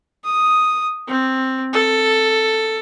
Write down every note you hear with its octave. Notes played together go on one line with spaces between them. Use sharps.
D#6
C4
A4